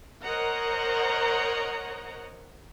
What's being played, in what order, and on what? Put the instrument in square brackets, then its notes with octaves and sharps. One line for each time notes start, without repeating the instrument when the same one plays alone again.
[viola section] A#4 C5 C#5 D#5 F#5 A#5